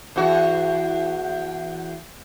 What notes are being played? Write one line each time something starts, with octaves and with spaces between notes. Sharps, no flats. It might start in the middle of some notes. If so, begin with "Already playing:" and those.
E2 F#4